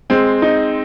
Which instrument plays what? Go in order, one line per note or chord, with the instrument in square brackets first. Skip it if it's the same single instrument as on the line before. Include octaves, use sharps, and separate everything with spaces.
[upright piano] G#3 [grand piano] C4
[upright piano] D#4